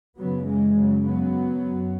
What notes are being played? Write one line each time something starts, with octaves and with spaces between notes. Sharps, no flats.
F#2 C#3 F#3 B3
E3 G#3
C#3 F#3
F#3 B3